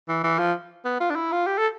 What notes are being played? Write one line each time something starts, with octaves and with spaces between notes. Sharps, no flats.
E3
E3
F3
B3
F4
D4
E4
F4
G4
A4